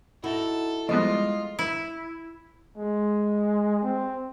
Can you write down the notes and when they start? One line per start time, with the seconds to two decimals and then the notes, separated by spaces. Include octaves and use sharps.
0.24 D#4 E4 F#4 A4
0.89 F3 G3 G#3 B3 F4 D#5
1.59 E4
2.77 G#3
3.83 C4